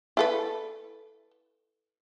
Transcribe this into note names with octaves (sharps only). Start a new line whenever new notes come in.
E4 A4 B4